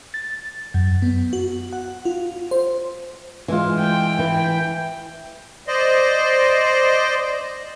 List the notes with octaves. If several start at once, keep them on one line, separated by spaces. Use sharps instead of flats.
A6
F#2
B3
F#4
F#5
F4
C5
E3 G#3 F4
G5
E3
C5 D5 D#5